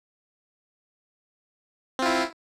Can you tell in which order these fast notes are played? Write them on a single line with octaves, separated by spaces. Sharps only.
C4 F4 E4